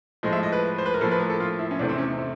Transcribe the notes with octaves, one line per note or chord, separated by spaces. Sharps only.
A2 F3 G#3 D#5
E5
D#5
B4
C5
B4
A#4
A2 F3 A#3 A4
B4
A#4
A4
F4
E4
C#4
E2 C3 E3 A3 D4
C4
C#4
D#4
E4